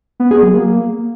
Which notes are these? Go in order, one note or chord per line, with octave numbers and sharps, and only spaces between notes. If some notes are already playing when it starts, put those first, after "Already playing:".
B3
G#4
F#3
A#3